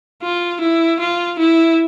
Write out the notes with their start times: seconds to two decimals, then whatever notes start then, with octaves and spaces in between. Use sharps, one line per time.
0.22 F4
0.61 E4
1.00 F4
1.39 E4